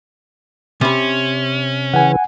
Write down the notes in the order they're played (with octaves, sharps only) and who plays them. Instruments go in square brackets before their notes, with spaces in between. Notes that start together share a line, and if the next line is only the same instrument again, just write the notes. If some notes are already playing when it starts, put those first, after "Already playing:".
[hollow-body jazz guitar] C3 B5 [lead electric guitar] C#4
[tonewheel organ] C#3 E3 [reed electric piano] F#5 G#5